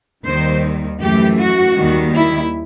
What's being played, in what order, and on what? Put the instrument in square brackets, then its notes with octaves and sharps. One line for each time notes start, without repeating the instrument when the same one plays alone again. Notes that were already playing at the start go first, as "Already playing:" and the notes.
[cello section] D#2 D#3 G3 C5
F#2 E3 A3 G4
F#4
D#2 D#3 G3
E4